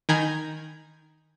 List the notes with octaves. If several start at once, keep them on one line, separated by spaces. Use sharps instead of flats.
D#3 G#5 A#5 B5 G6 G#6